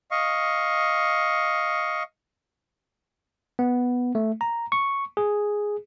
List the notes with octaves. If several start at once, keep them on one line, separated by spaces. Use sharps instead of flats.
D#5 F5 C#6
B3
A3
A#5
C#6
G#4